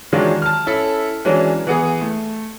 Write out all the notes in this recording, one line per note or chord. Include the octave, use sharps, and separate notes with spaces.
D#3 E3 F#3 G#3 D4 F4
A5 F6
C#4 E4 A4 E5
E3 F#3 G#3 C#4 D4
E3 B3 G#4
A3